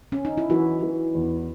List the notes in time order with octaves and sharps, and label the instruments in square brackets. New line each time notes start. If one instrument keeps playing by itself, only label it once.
[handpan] C#4
D#4
E4
[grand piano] E3 [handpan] F#4
[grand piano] E3
E2